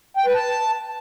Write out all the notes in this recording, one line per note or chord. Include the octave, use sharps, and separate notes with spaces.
G5
B4
A5